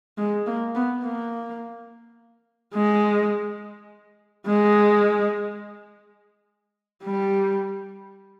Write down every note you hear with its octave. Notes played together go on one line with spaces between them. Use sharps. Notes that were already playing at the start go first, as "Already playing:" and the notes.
G#3
A#3
B3
A#3
G#3
G#3
G3